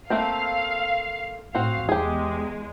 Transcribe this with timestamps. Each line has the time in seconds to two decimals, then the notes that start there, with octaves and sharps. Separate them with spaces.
0.10 A3 A#3 C4 F5
1.55 A2 C4 F#4 F5
1.89 E2 G#3 G4 G#4